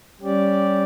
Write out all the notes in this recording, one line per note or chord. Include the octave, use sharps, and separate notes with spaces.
G3 C#4 G4 D5